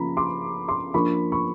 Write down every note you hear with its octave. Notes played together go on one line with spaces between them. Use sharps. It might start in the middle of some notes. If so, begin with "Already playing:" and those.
Already playing: C#3 F3 A#3 A#5 B5
C6 D6
C6 D6
F3 A#3 D4 B5 C#6
B5 C#6